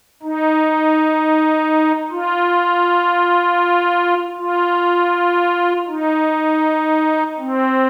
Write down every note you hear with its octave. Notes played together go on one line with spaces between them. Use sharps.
D#4
F4
F4
D#4
C4